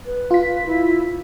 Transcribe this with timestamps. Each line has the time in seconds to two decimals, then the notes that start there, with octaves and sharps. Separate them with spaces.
0.06 B4
0.31 F4 B6
0.66 E4